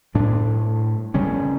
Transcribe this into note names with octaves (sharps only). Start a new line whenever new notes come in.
A2 G3 D4
C#3 G3 C#4